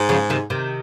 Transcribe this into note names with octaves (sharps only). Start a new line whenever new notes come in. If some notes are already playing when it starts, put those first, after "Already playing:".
Already playing: G#2
C#3 F3
C3 D#3
C3 D#3